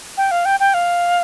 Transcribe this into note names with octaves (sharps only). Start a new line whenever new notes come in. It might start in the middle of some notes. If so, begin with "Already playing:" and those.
G5
F5
G5
G5
F5